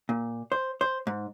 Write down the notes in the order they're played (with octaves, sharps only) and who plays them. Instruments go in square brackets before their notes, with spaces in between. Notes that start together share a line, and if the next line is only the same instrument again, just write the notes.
[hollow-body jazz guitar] A#2
C5
C5
G#2